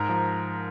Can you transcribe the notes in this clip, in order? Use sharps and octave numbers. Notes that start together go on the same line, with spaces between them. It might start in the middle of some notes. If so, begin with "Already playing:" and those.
Already playing: G#2 A#4
F3